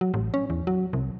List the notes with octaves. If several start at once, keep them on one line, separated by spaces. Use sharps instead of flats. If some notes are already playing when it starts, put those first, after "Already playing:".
F#3
A1
C#4
E2
F#3
C2